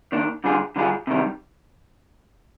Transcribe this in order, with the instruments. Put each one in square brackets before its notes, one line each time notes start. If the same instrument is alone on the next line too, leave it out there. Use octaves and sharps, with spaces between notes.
[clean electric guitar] D#3 A#3 D4
D3 G3 D4 F4 G#4
D3 G3 D4 F4 G#4
C3 D#3 G3